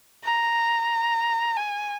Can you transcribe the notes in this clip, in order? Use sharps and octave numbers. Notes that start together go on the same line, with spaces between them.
A#5
G#5